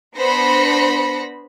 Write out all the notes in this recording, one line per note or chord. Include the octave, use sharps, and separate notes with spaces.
B3 D4 C5 B5 A#6 C#7